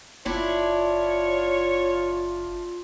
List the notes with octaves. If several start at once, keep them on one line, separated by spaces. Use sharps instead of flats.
F#1 D4 E4 F4 C#5